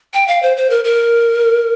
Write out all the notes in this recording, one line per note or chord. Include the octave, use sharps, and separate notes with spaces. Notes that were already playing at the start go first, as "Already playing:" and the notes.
G5
F5
C5
C5
A#4
A#4